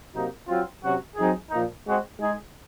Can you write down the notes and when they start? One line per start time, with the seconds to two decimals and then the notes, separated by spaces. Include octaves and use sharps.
0.14 C3 F#3 A#3 D#4
0.48 F#3 C4 F4
0.82 C3 F#3 C#4 F#4
1.16 F#3 C4 D#4 G#4
1.50 A#2 F3 A#3 D#4
1.85 G#3 C4 F#4
2.18 G#3 D#4 G#4